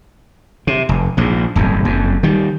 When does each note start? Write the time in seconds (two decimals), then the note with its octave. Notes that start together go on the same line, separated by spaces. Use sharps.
0.67 C3
0.89 F1
1.17 A#1 G#2
1.56 D1 G1 F2
1.85 F#1 F2
2.23 D#3 G3